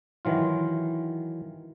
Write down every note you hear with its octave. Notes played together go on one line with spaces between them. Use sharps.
D#3 E3 F#3 F4